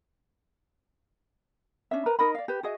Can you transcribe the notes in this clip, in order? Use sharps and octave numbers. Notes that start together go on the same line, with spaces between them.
C#4 D4 E5
A#4 B4 A#5
D#4 A#4 D#5 B5
D5 F5
G4 B4
F#4 G#4 D#5 E5